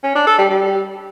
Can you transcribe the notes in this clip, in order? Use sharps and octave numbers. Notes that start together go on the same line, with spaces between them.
C#4
D4
A4
G3
G3